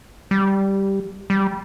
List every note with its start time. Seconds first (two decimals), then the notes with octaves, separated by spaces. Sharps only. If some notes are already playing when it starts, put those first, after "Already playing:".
0.31 G3
1.30 G3